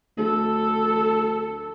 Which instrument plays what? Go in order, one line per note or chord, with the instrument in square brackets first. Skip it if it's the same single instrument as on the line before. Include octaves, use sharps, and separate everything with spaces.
[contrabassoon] D2 [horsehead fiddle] A4